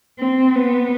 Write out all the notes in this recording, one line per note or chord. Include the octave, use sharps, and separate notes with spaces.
C4
B3